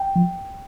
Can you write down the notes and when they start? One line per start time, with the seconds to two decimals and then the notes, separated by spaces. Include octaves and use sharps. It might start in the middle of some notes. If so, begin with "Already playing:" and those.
Already playing: G5
0.16 F3